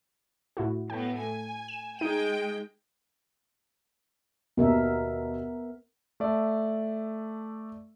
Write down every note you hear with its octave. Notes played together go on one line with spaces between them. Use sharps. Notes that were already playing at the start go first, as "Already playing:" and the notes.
A2 E4 F#4
A2 A3 B3 G5
G#5
E7
G#3 D#4 G5 D#7
D#2 B2 B3 A#4 E5
A3 A4 D5 E5